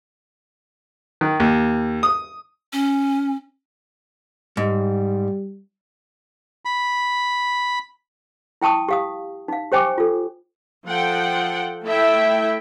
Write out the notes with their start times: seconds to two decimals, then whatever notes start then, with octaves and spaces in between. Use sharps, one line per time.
1.21 D#3
1.40 D#2
2.03 D#6
2.73 C#4
4.57 G#2 G3
6.65 B5
8.62 E4 G5 A5 C#6 D#6
8.89 G4 F5 D#6
9.48 D#4 F5
9.72 G4 C5 G5 G#5 C#6 D6
9.98 F4 A4
10.87 F3 A4 F#5 G5
11.84 A3 E4 A4 E5 G5